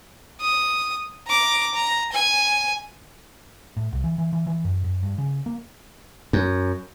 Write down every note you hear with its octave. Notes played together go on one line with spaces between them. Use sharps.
D#6
A#5 D6
A#5
G#5
A2
C2
E3
E3
E3
E3
F#2
F#2
G2
C#3
A#3
F#2